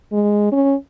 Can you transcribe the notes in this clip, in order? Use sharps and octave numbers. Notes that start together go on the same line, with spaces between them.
G#3
C#4